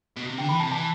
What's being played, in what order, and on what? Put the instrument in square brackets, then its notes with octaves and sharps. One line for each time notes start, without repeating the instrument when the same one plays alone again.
[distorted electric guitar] B2
C3
[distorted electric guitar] D3 [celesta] G5
[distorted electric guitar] E3 [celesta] B5
[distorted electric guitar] C3 [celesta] A5
[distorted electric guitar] E3 [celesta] A5